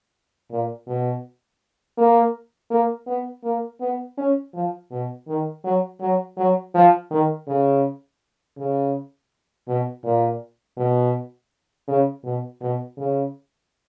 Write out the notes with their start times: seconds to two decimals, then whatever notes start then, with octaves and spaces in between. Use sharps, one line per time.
0.51 A#2
0.87 B2
1.98 A#3
2.70 A#3
3.07 B3
3.44 A#3
3.81 B3
4.18 C#4
4.54 F3
4.91 B2
5.28 D#3
5.64 F#3
6.01 F#3
6.37 F#3
6.74 F3
7.11 D#3
7.47 C#3
8.57 C#3
9.68 B2
10.04 A#2
10.77 B2
11.88 C#3
12.24 B2
12.61 B2
12.97 C#3